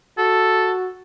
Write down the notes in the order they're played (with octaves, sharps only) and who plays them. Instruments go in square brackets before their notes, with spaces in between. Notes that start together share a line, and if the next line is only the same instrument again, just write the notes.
[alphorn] F#4 [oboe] A4